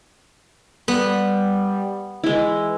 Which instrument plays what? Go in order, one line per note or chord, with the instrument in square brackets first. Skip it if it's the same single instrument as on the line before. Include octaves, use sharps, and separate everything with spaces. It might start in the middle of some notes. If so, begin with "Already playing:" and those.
[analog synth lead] G3 [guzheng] B3
[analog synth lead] E3 [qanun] G#3 E4